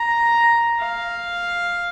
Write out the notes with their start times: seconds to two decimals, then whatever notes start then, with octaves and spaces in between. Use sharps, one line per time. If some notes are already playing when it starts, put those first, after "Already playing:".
Already playing: A#5
0.79 F5